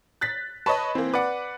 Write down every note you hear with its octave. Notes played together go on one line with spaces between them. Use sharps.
F#6 A6 B6
B4 C#5 D#5 A5 B5 C#6
E3 A#3 C4
B4 D5 F#5 D6